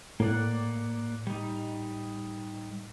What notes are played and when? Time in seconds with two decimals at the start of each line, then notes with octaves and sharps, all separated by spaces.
0.20 A2 A#3 D5 F#5
1.27 G3 D#4